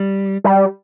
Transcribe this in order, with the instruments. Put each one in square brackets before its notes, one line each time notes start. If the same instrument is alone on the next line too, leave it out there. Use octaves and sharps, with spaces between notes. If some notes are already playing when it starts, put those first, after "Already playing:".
Already playing: [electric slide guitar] G3
[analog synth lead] G3